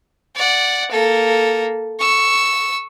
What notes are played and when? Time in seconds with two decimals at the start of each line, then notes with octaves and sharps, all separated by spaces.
0.35 D5 F#5
0.91 A#3 A4
1.99 C#6 E6